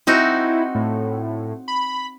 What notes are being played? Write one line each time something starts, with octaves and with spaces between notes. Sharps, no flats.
C4 D#4 E4 F#4
A2
B5